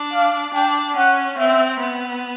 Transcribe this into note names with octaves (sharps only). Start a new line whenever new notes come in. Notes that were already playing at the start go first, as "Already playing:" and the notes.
Already playing: D4
F5
D4 G5
C#4 F#5
C4 E5
B3